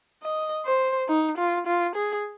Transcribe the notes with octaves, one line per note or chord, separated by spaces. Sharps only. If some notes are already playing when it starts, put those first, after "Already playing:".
D#5
C5
D#4
F4
F4
G#4